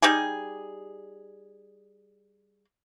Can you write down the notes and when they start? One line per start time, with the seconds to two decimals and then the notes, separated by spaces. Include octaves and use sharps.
0.02 G3 D#4 G4 G#4